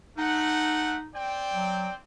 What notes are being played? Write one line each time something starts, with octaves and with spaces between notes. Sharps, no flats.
A3 D#4 A4 F#5
C4 D5 G5
F#3